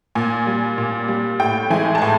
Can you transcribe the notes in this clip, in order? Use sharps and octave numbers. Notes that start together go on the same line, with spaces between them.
A#2 G#5
G3
A#2
G3
A2 G5
E3 G#3 G#5
A5
A2 G#5